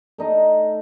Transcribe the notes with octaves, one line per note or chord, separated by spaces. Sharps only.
A3 D#4 D#5